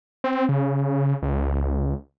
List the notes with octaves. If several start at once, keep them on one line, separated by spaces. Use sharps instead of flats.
C4
C#3
C#2